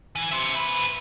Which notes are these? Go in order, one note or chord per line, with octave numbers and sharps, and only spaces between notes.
E3
C5 E5
G#2 B4